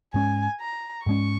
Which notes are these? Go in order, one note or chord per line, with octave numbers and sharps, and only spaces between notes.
G#2 G#3 C#4 G#5
A#5
G#2 G#3 C#4 C#6